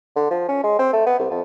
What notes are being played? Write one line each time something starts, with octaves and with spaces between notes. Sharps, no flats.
D3
F3
C#4
G#3
C4
A3
B3
C2
F2